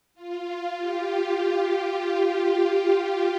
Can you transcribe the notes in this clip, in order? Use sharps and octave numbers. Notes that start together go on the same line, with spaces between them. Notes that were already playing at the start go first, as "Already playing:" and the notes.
F4
G4